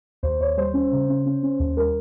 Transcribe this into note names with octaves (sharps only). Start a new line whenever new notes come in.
D#2 C5
D#2 C#5
G3 C5
C#4
C#3
C#4
C#4
C#4
D#2
G3 A#4